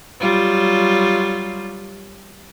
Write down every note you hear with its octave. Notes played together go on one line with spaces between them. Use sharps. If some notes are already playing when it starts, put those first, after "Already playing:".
F#3 G3 F4